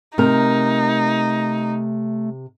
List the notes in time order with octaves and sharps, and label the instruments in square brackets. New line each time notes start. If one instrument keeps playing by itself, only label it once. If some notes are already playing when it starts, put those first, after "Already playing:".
[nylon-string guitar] C3 A#4 [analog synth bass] A3 [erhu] D#4